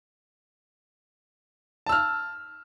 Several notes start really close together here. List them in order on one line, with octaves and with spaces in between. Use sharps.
A5 E6 F6